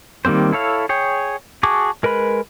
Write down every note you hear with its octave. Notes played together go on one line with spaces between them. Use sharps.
D#3 G3 A#3 C4 C5
E4 A4 C#5 F5
G#4 C#5 G5
F#4 G#4 A5 C#6 D6
G#3 A#4 B4 B5